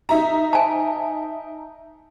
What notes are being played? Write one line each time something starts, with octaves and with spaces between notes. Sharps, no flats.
D#4 E5 A#5
G#5 A5